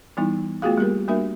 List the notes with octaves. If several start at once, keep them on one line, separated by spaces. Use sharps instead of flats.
E3 G3 B3 D#4 E4
A3 B3 F4 F#4 G#4 F5
G3 A#3 G4 A#4
G3 A#3 D4 F#4 A#4 E5